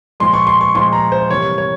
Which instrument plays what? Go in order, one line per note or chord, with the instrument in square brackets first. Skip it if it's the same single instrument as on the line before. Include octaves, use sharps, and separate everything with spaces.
[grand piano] A#2 F3 G#3 C6
C#6
C6
C#6
A#2 F3 G#3 C6
A#5
C5
C3 E3 G3 A#3 C#5
C#5